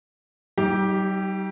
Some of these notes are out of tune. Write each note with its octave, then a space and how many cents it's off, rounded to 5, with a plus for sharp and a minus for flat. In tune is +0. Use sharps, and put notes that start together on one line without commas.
G3 -40 D#4 +25 G4 +0